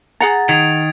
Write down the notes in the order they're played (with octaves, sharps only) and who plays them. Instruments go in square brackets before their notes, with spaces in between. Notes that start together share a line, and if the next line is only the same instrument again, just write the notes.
[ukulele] G#4 F#5 A#5 [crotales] A6
[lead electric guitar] D#3 [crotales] G#6 D7 F7